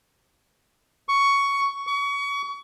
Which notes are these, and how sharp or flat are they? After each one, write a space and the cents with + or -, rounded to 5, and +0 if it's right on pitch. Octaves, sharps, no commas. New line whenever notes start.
C#6 +10
C#6 +30